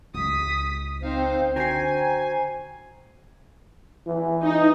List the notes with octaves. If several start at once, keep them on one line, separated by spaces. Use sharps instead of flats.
C#2 D#6 B6
C4 D#4 C5 F5
D3 F#4 C5 G5 G#5 A#5 C7
E3
D#4